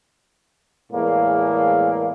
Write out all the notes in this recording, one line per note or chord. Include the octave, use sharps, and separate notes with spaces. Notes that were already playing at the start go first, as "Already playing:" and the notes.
E2 A2 G#3 A#3